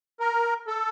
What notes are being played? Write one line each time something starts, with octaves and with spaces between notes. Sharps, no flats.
A#4
A4